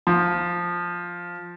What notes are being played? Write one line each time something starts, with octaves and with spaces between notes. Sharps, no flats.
F3